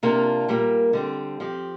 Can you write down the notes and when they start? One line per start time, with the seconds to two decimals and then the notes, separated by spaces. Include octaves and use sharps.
0.03 C3 A#3 D4 F4
0.48 A#2 G3 A#3
0.93 D3 G3 C4
1.40 F3 C4 G4